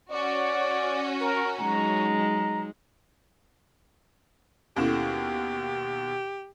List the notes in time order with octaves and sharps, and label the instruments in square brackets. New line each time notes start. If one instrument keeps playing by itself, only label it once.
[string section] C#4 F#4 [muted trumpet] D5
[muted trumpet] A#4
[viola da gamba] F#3 G#3 D#4 [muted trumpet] A#5
[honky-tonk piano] D#2 B2 E7 [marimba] C#4 E4 A4 [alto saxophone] G4